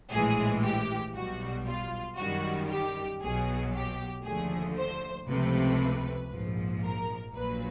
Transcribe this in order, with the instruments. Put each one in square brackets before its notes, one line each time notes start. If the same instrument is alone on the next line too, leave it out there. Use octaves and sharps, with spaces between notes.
[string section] A#1 A2 E3 G#3 G#4
G4
B1 B2 G3 F#4
F4
F#2 D#3 G3 F#4
G4
B1 B2 F#3 G#4
G4
D#2 D3 F3 A3 G#4
C5
C#2 C3 F3 A3 B4
A#1 G#2 F3
A#4
A#1 A#2 F#3 B4